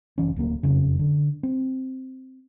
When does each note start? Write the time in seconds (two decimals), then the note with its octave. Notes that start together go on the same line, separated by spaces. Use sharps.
0.18 F#1 E3 C#4
0.36 D1 D2 G3 A#3
0.63 F#1 F2 C#3
0.99 D3
1.43 C4